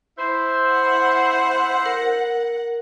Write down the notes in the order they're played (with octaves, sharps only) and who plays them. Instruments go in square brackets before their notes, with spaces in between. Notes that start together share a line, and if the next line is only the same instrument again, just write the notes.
[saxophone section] E4 C5
[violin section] F#5
[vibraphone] A#4